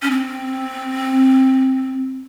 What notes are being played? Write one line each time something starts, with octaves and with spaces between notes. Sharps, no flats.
C#4
C4